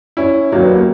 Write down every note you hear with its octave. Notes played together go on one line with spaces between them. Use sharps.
C#4 E4
D#2 D#3 F#3 A#3 C#4
B3
A#3